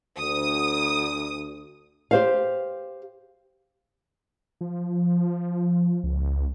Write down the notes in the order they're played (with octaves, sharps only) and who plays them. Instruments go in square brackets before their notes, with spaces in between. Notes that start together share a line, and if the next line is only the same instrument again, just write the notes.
[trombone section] D2 [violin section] D#6
[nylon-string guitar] G4 C5 F5
[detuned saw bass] F3
C#2